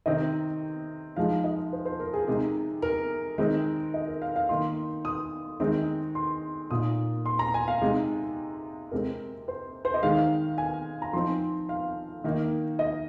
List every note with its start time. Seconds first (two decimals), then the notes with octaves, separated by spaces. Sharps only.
0.06 C3 D#3 C4 D#4 D#5
1.16 F3 G#3 D#4 F5
1.44 D#5
1.73 C5
1.86 C5
2.00 A#4
2.14 G#4
2.28 C3 G#3 D#4
2.82 A#4
3.38 D#3 G#3 C4 D#4
3.94 D#5
4.08 A#4
4.22 F5
4.36 F5
4.49 D#3 A#3 D#4 C6
5.05 D#6
5.60 D#3 G#3 C4 D#4
6.15 C6
6.71 A#2 A#3 D#4 D#6
7.26 C6
7.39 A#5
7.54 G#5
7.68 F5
7.82 C3 G#3 D#4
8.91 C3 G#3 C4 A#4
9.48 C5
9.85 C5
9.94 D#5
10.03 D#3 G#3 D#4 F5
10.58 G#5
11.02 A#5
11.13 F3 C4 D#4 C6
11.69 F5
12.24 D#3 A#3 D#4
12.79 D#5